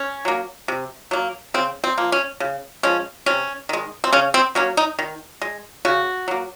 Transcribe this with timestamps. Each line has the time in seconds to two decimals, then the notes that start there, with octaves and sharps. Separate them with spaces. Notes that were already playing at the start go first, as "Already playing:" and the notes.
Already playing: C#4
0.25 F#3 A#3
0.68 C3
1.11 F#3 A#3
1.54 C#3 C4
1.84 C4
1.98 F3 A#3
2.12 C#4
2.40 C#3
2.83 F3 G#3 C#4
3.26 C3 C#4
3.69 D#3 G#3
4.04 C4
4.13 C#3 C#4
4.34 C4
4.55 F#3 A#3 C#4
4.77 D#4
4.99 D#3
5.41 G#3
5.85 C#3 F#4
6.28 F#3 A#3